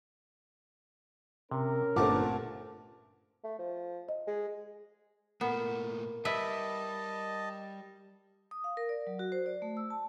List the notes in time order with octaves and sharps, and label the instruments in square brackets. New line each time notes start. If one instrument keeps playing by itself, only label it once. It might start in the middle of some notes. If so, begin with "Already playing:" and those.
[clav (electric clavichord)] C3 [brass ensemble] C#4 A#4
[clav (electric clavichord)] G1 [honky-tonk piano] A#2 A3 C4 [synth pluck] F#5 A5 D6
[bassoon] A3
F3
[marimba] D#5
[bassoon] G#3
[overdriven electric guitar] A#2 A3 [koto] B3 [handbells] A#4
[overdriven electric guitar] G3 [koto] E4 B4 E5 [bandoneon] D#5 A5
[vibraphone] D#6
F5
A#4
D5
F#3
F#4
C5
D5
A3
E6
A5